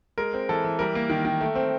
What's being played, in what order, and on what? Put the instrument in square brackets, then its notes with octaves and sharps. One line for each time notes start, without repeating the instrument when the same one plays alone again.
[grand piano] G#3 A#4
C4
E3 A4
E3
G3 A#4
A#3
D#3
D#3
A3
C4